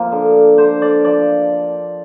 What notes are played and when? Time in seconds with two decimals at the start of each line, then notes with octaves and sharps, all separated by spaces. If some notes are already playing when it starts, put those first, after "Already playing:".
Already playing: F3 A#3
0.12 D3
0.58 D3 C5
0.82 D5
1.05 F3 D5